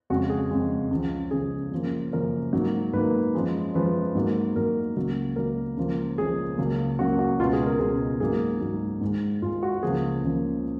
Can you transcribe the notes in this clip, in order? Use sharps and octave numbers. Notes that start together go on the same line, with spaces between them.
F2 C#3 G#3 F#4
G#4
F2 C#3 G#3
C#2 C#3 F3
C#2 C#3 F3 G#4
F#2 C#3 F3 A#3
F#2 C#3 F3 A#3 A#4
G#2 D#3 F#3 A#3
G#2 D#3 F#3 A#3 B4
F#2 F3 G#3
F#2 F3 G#3 B4
G#2 F#3 A#3
G#2 F#3 A#3 A#4
C#2 C#3 F#3 A#3
C#2 C#3 F#3 A#3 A#4
C#2 C#3 F3 A#3
C#2 C#3 F3 A#3 G#4
C#2 C#3 F#3 A#3
C#2 C#3 F#3 A#3 F#4
F#4
C#2 B2 G#3 F4
G#4
A#4
C#2 B2 G#3 G#4
G#2 F#3 A#3 G#4
G#2 F#3 A#3
G#2 D#3 G#3
G#2 D#3 G#3 F4
F#4
C#2 C#3 F3 A#3 G#4
C#2 C#3 F3 A#3